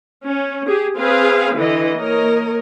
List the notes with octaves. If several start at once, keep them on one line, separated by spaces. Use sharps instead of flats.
C#4
G4 G#4
C4 G#4 B4 F5
D3 E3 D#5
A#3 A#4 C#5 D#5